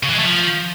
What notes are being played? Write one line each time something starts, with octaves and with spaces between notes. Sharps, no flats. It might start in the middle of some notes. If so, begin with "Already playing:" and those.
C#3
E3
G#3
A3
F3